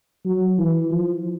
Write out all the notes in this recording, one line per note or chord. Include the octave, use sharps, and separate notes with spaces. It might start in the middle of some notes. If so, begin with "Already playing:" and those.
F#3
E3
F3